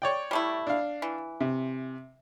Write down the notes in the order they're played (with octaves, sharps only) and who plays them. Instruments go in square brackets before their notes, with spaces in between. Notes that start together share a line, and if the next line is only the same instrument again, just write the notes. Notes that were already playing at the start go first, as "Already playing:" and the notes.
[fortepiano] C#5 D5 G5
[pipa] G3 A3 E4
[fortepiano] D4 F5
[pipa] E3
[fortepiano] C3